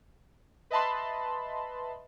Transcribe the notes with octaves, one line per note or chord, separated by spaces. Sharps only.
B4 D#5 E5 A5 B5 C6